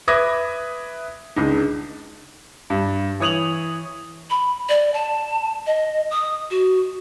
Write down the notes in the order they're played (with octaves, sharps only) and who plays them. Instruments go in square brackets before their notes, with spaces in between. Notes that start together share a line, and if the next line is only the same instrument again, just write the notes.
[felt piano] B4 E5 D6 D#6 G#6 A#6
C#2 D4 D#4
[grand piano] G2
E3 C#5 D#6 F7 F#7
[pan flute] B5
D5
A5
D#5
D#6
F#4